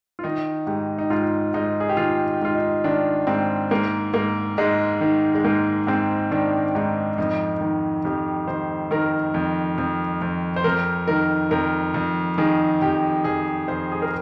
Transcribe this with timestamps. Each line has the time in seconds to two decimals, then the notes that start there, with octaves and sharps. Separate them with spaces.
0.19 F4
0.24 D#3 D#4
0.67 G#2 G4
0.98 D#4
1.10 G#2 F4
1.54 G#2 D#4
1.80 G#4
1.89 G4
1.97 D#3 F4
2.41 G#2 F4
2.55 D#4
2.84 D#3 D4
3.27 G#2 C4
3.71 G#2 A#3
4.14 G#2 A#3
4.58 G#2 G#3
5.01 D#3
5.35 G#3
5.44 G#2 A#3
5.87 G#2 C4
6.31 D#3 D4
6.75 G#2 D#4
7.18 F2 D#4
7.61 D#3
8.05 F2 G4
8.47 D#3 C5
8.91 D#3 A#4
9.34 F2
9.78 F2
10.22 F2
10.56 C5
10.64 F2 A#4
11.08 D#3 A#4
11.51 F2 A#4
11.94 F2
12.38 D#3 G#4
12.82 F2 G4
13.24 F2 G#4
13.68 F2 C5
13.92 G#4
14.02 A#4